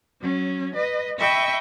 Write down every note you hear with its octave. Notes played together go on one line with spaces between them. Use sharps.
F#3 C#4
B4 D#5
D#5 E5 G5 B5 C#6